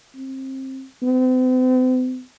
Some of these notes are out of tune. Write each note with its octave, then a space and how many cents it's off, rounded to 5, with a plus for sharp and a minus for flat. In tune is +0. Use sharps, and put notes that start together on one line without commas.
C4 +25
C4 -45